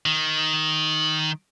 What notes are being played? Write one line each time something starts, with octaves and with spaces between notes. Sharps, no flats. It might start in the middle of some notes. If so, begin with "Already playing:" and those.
D#3